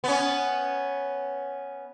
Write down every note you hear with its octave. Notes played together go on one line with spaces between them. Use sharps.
B3 C#4